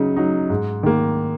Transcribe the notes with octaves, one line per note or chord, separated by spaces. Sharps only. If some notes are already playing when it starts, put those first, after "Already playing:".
Already playing: C#3 F#3 D#4
F#3 D#4
G#2
D#3 A#3